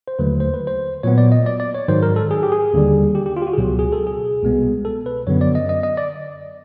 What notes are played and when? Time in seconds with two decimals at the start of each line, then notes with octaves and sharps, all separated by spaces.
0.08 C5
0.19 D#2 D3 F#3 A3 B4
0.40 C5
0.54 B4
0.67 C5
1.03 A#2 F#3 B3 C#5
1.18 D5
1.32 D#5
1.46 D5
1.60 D5
1.75 C#5
1.88 G#2 D#3 F#3 C5
2.03 A#4
2.16 A4
2.31 G#4
2.43 G4
2.52 G#4
2.73 D#2 D3 G3
3.15 G4
3.26 G4
3.37 F4
3.42 G4
3.47 F#4
3.53 G#4
3.58 C#2 B2 F#3 G4
3.79 G#4
3.93 A4
4.07 G#4
4.43 C2 B2 G#3 B3
4.85 A4
5.06 B4
5.27 F#2 D3 F#3 B3 C#5
5.41 D5
5.55 D#5
5.69 D#5
5.83 D#5
5.97 D5